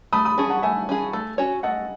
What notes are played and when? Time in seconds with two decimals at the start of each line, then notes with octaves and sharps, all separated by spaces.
0.13 A3 B5 D#6
0.25 B5 D#6
0.38 C#4 G#4 A5 C#6
0.50 F#5 A5
0.62 A3 E5 G#5
0.89 C#4 G#4
1.13 A3
1.38 C#4 F#4 C#5
1.63 A3 D#5 F#5